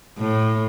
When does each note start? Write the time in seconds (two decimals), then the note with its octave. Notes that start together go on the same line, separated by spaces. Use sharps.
0.18 A2